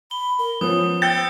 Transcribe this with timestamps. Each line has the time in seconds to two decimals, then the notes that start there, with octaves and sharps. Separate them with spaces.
0.11 B5 G7
0.39 A#4
0.61 F3 B3 C#4 C5 D#6
1.02 G5 E6 G6 A6 C#7 G7